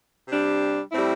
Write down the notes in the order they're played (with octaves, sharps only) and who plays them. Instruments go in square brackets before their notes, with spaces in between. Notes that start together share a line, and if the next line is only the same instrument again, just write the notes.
[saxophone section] C3 G3 D4
A2 G3 C4 E4